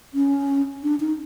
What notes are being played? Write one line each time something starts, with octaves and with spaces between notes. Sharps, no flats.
C#4
D4
D#4